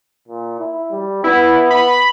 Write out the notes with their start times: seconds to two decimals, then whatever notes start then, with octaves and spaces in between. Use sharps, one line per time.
0.28 A#2
0.59 E4
0.91 G3
1.24 B3 E4
1.70 B5